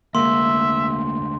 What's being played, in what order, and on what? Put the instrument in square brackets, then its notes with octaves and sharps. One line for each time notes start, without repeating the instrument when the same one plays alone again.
[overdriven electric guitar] D2 G#3 [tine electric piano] A#3 [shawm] E5 [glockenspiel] C6